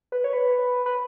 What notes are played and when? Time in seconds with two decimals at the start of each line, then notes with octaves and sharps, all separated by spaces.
0.12 B4
0.24 C#5
0.33 B4
0.86 B4